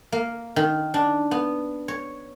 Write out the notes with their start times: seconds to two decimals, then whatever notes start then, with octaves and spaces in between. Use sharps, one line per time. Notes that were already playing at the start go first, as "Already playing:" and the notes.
0.12 A#3
0.56 D#3
0.94 D4
1.31 B3
1.88 C#5